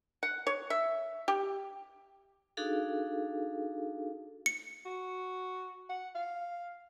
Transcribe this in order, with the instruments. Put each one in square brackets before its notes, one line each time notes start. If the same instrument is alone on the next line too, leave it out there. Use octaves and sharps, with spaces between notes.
[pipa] F#5
C#5
E5
G4
[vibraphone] D4 D#4 F#4 G#4 A4 F5
[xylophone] C#7
[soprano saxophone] F#4
F#5
F5